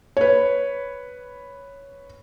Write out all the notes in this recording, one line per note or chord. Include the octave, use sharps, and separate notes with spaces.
B4 C#5